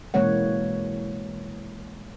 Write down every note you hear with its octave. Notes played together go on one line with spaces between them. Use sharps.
B2 E3 G#3 A#3 C#5 F#5